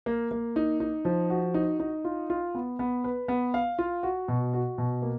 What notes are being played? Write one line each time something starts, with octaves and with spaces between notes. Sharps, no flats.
A#3
A#3
D#4
D#4
F3
F#4
D#4
D#4
F4
F4
B3
B3
B4
B3
F5
F4
F#4
B2
F#4
B2
A#3